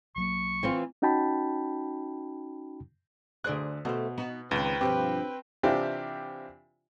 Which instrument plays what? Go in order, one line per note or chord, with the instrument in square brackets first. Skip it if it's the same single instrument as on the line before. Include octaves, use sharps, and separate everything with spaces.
[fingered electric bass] B1 F#3 A#3 [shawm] C#6
[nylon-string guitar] E3 C4 F4
[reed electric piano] C#4 D#4 F#4 G5 A5 B5
[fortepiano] D2 F#6 [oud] G#4 C5 D5
[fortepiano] B2 [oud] A3 C5
[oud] B3 D#4 F#4
[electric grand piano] C#2 [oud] D#3 C4 [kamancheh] B4 G5
[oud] G2 B2 F3 [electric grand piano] C4 [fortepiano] G4
[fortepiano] C3 E3 C4 D4 F4 G4